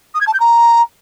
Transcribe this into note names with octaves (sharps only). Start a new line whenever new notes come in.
D#6
G#6
A5
G6
A#5